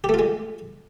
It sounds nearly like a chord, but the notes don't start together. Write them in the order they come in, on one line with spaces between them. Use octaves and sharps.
G4 A3 F4 G#3